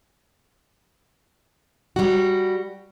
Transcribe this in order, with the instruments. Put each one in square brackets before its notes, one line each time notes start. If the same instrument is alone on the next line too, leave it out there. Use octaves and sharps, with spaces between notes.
[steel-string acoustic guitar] G3 F#4